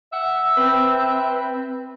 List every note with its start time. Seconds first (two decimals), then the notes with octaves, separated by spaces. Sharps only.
0.13 E5 F#5
0.57 C4 B4